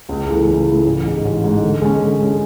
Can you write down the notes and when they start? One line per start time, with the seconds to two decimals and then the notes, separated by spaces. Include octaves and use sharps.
0.09 C#2
0.28 C#3 E3 A3
0.47 C#2
0.66 C#3 E3 A3
0.86 A1
1.05 G#2 G#3
1.25 A1
1.44 G#2 G#3
1.62 D3
1.82 G#3 C#4
2.01 D3
2.21 G#3 C#4